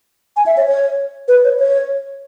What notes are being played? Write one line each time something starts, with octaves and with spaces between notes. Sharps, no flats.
G#5
E5
C#5
C#5
B4
C#5
C#5